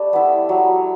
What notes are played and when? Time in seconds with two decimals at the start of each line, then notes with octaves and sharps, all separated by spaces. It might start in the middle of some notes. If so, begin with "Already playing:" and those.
Already playing: G3 A3 D4
0.13 B3 E4
0.49 F#3